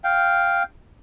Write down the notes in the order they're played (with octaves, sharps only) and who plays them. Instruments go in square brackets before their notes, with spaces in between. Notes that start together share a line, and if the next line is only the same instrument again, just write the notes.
[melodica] F5 G5